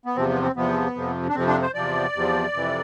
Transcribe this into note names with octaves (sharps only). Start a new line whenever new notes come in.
B3
E2 C3 F3 C4
B3
C4
E2 C3 F3 B3
F2 C3 F3
D4
F2 C3 F3 C4
D4
C5
E2 C3 F3 D5
E2 C3 F3
F2 C3 E3